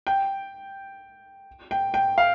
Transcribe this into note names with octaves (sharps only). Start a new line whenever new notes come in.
G5
G5
G5
F5